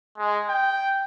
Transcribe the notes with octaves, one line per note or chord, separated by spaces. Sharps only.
G#3
G5